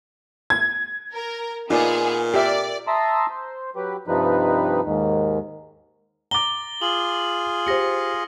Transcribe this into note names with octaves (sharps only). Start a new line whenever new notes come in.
G#6
A#4
A#2 B3 D#4 F4 G#4 D5
G4 A#4 D5 E5
E5 A5 A#5 C6 D#6 E6
C5
F#3 G4 B4
G2 C3 F3 G3 D#4 B4
D#2 G#2 D#3
A#5 D6 A6 G7
F4 G#4 F#7
G4 C5 A#6 C#7